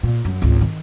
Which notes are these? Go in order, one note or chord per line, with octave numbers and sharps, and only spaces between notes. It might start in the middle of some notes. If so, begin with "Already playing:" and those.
A#2
F#2
G#1 C#2
D#3